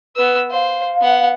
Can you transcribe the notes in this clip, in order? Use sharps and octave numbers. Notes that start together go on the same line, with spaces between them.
B3 B4 E6
C5 F5
B3 F#5